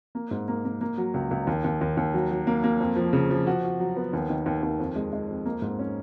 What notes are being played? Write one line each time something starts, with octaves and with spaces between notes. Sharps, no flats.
A#3
G#2
A#3
A#3
A#3
F#3
C#2
C#2
D#2
D#2
D#2
D#2
F#3
F#3
A#3
A#3
F2
F3
C#3
F3
F#4
F#4
F#3
B3
D#2
D#3
D#2
D#2
F2
G#3
G#3
F2
A#3
G#2
C#4